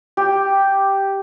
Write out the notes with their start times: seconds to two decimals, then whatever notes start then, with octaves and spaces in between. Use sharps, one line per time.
0.17 G4